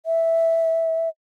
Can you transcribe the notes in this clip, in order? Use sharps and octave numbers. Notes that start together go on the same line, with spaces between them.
E5